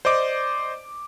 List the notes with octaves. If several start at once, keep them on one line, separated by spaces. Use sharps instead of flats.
C5 D5 D#5 D6